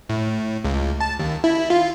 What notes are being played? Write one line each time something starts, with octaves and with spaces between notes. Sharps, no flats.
A2
C#2
A5
D#2
E4
F4